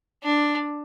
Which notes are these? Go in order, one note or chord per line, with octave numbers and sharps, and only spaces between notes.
D4